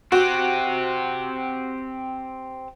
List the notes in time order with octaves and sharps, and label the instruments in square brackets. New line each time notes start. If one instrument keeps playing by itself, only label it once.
[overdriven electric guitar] C4 G4 [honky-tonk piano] F#4